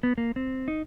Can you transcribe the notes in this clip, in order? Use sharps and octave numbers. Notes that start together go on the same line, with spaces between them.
B3
A#3
C4
D#4